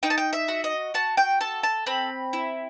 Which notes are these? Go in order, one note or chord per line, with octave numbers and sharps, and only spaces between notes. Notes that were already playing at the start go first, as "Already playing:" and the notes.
D#4 G5
A5
G5
E5
F#4
D#5
F#4 A5
G5
A4 A5
A5
C4 B5
E4